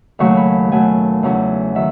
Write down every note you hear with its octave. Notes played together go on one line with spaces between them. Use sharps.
D#2 C#3 F#3 A3 C#4 C#6
B5
B2 F#3 A3 G#5
E2 C#3 F#3 C#4 E4
D#3 F#3 E5